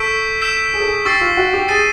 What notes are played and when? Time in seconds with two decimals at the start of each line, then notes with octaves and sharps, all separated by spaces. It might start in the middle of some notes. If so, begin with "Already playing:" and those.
Already playing: A4 C#6 E6 G6 B6 D7
0.42 E6 G6 B6 E7
0.74 G#4
0.80 A4
0.87 G#4
1.05 G4 C#6 E6 A6 C7
1.21 F4
1.37 F#4
1.53 G4
1.68 G#4 A6 C7 D#7